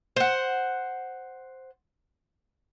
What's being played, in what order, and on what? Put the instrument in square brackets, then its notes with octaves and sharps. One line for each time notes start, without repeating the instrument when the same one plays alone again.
[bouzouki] C5 F#5